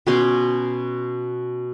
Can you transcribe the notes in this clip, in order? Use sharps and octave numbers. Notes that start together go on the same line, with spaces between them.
B2 C#4 C6 D6